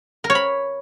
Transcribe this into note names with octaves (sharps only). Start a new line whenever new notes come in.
A#4
C#5
B5